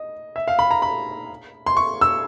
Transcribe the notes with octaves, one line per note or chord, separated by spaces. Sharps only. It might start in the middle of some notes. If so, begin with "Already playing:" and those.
Already playing: D#5
E5
F5
B5
A#5
B5
C6
C#6
E6